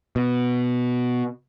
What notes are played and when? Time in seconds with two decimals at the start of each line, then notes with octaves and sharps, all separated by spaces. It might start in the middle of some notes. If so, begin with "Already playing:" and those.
0.16 B2